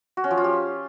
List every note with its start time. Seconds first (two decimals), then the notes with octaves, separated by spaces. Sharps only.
0.17 F#4
0.24 C#4
0.31 F3
0.37 F4
0.44 G4